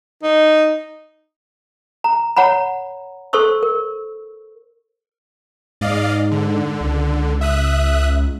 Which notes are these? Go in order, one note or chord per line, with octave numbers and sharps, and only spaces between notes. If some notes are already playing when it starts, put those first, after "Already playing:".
D#4
A#5
C#5 F#5 A#5 B5
A4 C5 C6 C#6 E6
A#4
G#2 D5 D#5 F5
D3
C#2
E5 D#6 F#6